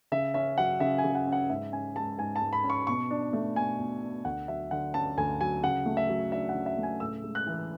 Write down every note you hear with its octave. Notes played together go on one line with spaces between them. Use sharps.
C#3 E5
C#4 E5
F#3 F#5
C#3 E5
G#5
C#3
F#5
C#4
F#5
G#2 E5
C#4 G#5
G#3 A5
G#2 G#5
A5
G#2
B5
C#4
C#6
B2 C#6
D4
A3
B2 G#5
B2
D4
D2 F#5
F#3 E5
D3 F#5
C#4 A5
D2 G#5
F#3 G#5
C#3 F#5
A3
E5
F#3
D4 E5
F#5
C#3
E5
A3
G#5
A2 E6
G#3
F#6
E3